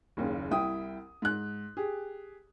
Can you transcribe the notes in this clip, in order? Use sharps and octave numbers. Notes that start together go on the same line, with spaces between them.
F#1 D#2 C#3
C2 E4 G5 D#6
G#2 F#6
G4 G#4